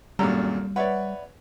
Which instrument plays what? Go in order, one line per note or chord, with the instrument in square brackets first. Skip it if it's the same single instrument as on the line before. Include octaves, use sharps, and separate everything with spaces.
[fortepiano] G#1 F#2 A#2 [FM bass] G3 [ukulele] A4 A#5
[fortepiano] B4 C#5 [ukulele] D5 E5 F#5